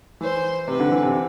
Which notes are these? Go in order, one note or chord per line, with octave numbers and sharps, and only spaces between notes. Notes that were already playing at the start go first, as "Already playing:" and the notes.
E3 C5
C3 B4
D3
E3
C3